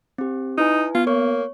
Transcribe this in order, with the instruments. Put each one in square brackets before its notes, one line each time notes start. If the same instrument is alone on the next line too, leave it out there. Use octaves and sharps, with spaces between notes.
[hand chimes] C4 G4
[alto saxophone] D#4 [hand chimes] E4 B4 G#5
[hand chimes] B3 [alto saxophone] F4
[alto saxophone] A#3 [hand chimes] C#5 C#6